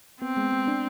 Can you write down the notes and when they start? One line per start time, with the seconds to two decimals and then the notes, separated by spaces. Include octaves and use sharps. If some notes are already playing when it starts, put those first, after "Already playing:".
0.22 B3 C4
0.37 G#3
0.53 G#3
0.68 D4